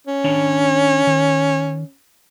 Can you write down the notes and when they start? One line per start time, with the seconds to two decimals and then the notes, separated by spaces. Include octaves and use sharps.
0.07 C#4
0.24 D#3 D4 C#5
1.07 D#3